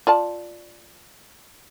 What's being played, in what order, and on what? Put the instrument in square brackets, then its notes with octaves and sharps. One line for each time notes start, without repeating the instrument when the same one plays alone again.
[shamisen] F4 D5 A5